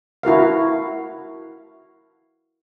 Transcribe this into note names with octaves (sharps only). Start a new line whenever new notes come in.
E4 F#4 A#4 F5